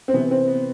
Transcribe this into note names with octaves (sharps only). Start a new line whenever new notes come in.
C4
C3 E3 B3
C4
B3